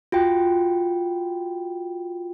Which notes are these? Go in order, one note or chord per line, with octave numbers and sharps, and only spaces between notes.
F4 F#4 G5